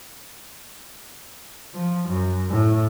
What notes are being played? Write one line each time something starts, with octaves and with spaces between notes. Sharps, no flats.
F3
F#2
A2